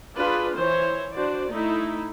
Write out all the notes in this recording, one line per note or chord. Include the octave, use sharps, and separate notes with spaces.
D4 F4 G#4 B4
E3 C5 C#5
D4 F#4 C5 D5
A3 D#4 E4